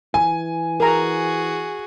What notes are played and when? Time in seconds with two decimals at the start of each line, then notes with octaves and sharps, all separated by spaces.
0.14 E3 G#5
0.80 F#4 G#4 A#4 A#5